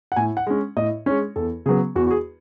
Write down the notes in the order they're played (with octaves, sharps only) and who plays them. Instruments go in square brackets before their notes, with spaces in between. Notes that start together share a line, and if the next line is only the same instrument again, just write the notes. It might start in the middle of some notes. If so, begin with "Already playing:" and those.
[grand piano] F#5
A2 G#5
F#5
G#3 C#4
A2 D#5
C#4 C#5
G#3
E2 A4
C#3 F#3 B3 G#4
E2 F#4
F#4
G#4